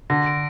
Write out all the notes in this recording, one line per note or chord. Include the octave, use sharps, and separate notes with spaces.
D3 A#6
D7